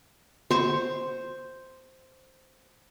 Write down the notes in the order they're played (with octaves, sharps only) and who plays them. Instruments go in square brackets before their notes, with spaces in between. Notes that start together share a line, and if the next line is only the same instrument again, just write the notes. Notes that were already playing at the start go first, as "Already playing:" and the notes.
[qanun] C5 C#6